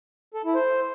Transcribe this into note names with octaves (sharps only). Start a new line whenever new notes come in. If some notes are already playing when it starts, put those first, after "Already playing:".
A4
E4
C5